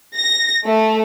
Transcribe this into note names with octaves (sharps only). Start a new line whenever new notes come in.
A#6
A3